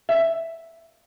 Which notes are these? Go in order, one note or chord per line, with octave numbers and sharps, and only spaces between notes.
E5